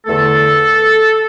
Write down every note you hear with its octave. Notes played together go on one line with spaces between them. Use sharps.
E2 D3 A3 A4